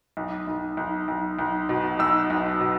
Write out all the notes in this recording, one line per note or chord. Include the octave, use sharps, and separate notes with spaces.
B1
B1
B1
B1
B1
B2
B1 E6
B1
B2